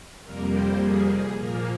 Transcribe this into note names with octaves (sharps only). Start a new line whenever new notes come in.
F2 C3 G3 A#3 A#4
C5
G#4
G#4
A#2 F3 A#3 A#4